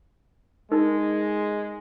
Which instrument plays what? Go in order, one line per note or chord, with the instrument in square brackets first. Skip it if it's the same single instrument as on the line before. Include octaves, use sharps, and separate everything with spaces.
[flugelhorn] G#3 [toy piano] D#4 A#4